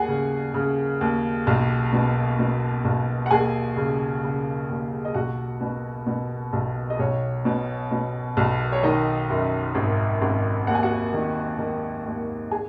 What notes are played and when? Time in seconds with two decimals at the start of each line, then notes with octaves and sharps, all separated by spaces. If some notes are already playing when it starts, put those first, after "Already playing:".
Already playing: D#2 G#4 F#5 G#5
0.08 C#3
0.54 C#3
1.01 D#2
1.47 B1
1.93 B2
2.39 B2
2.85 B1
3.26 F#5
3.31 D#2 G#4 G#5
3.76 C#3
4.23 C#3
4.69 D#2
5.05 D#5
5.14 B1 F#4 F#5
5.61 B2
6.07 B2
6.53 B1
6.90 D#5
6.99 B1 C#5
7.45 B2
7.91 B2
8.37 B1
8.72 C#5
8.83 D#3 D#4 D#5
9.30 F#2
9.75 G#1
10.22 G#1
10.67 D#2 F#5
10.75 G#5
10.83 F#4 F#5
11.14 D#3
11.59 D#3
12.06 D#2
12.51 G#4 G#5